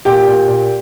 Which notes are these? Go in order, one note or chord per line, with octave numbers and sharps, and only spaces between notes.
A#2 G4 G5
A#2
A#2